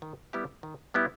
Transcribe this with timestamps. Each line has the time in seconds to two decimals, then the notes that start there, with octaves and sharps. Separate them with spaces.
0.02 D#3
0.33 G3 B3 E4 G4
0.63 D#3
0.94 G3 B3 E4 G4